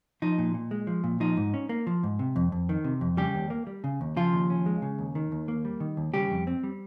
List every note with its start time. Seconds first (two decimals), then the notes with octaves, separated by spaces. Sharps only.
0.22 F3 D#4
0.38 A#2
0.54 A#2
0.71 G#3
0.87 F3
1.04 A#2
1.20 F3 D#4
1.37 G#2
1.54 C#4
1.69 A#3
1.87 F3
2.03 G#2
2.19 C3
2.36 F2
2.52 F2
2.69 D#3
2.84 C3
3.01 F2
3.17 C#3 G3 G4
3.35 D#2
3.50 A#3
3.67 G3
3.84 C#3
4.01 D#2
4.16 C#3 F3 F4
4.32 D#2
4.50 C#4
4.66 G#3
4.82 C#3
4.99 D#2
5.15 D#3
5.32 D#2
5.48 A#3
5.65 G3
5.80 D#3
5.97 D#2
6.13 C#3 G3 G4
6.31 F2
6.47 C4
6.64 G3